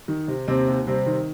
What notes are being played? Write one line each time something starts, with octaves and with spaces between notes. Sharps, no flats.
D#3
C3
D#2 C3 C4
D#2
C3 G3 C4
D#3